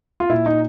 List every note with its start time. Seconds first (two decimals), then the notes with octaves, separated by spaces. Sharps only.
0.20 F4
0.29 A#2 E4
0.46 D#4